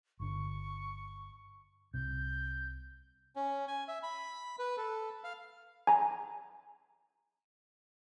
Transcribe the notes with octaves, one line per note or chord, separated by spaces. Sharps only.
G1 D3 C#6
C2 C3 G6
C#4
G#5
E5
B5
B4
A4
F5
G#5 A#5